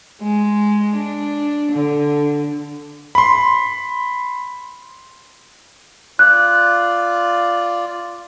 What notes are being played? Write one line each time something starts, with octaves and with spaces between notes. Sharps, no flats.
G#3
D4
D3
B5 C6
F4 D5 F#6